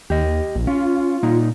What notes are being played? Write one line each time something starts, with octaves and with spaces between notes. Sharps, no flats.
D#2 G4 D#5
A#1
C#4 F4
A#2 A#3 D#4